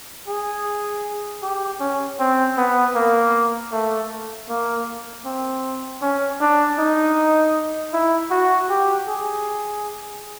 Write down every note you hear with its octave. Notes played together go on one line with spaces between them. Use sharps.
G#4
G4
C#4
C4
B3
A#3
A3
A#3
C4
C#4
D4
D#4
E4
F#4
G4
G#4